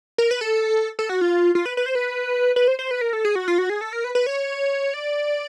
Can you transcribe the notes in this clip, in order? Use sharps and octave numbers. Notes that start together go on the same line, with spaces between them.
A#4
B4
A4
A4
F#4
F4
F4
B4
B4
C5
B4
B4
C5
C5
B4
A#4
A4
G#4
F#4
F4
F#4
G#4
A4
A#4
B4
B4
C#5
D5